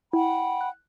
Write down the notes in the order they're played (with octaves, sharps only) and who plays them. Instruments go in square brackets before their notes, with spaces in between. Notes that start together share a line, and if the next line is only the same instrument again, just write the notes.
[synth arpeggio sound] E4 [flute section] F#5 G5 B5
[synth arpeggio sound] F#6